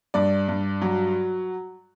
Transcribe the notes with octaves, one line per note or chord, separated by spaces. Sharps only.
G2 D5
G2
F#3